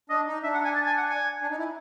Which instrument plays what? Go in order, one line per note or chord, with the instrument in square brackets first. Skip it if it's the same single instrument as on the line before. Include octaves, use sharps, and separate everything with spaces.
[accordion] D4 [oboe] D#5
[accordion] D#4
[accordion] D4 [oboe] E5
[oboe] F#5
G#5
A5
G#5
F#5
G#5
[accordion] D4
D#4
E4